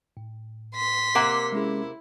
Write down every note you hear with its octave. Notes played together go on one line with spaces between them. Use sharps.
A2
C6 B6
C3 A#3 F#5
G#3 C#4 E4 G#4